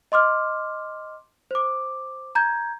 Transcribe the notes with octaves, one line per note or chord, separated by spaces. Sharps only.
D#5 C6 D6 F6
C5 D6
A#5 G6 G#6